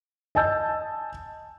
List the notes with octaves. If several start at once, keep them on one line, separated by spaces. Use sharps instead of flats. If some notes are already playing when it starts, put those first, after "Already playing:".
D#5 G#5 A5 E6 G6